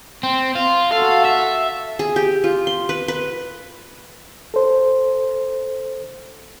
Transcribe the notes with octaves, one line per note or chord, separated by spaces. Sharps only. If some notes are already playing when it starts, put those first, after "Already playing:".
C4
F4
F#4 A4 F5
E5
G#4
G4
F4
C6
B4
B4
A4 C5